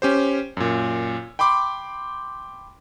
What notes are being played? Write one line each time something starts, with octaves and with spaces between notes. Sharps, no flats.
C#4 G4 C5
F#2 A#2
G5 B5 C6 D6